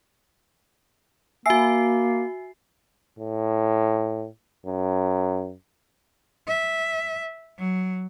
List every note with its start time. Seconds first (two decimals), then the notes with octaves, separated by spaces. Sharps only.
1.46 A#3 F#4 E5 G#5 E6 C7
3.19 A2
4.66 F#2
6.48 E5
7.58 F#3